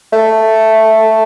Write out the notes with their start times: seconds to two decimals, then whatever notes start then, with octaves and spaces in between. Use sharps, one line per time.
0.13 A3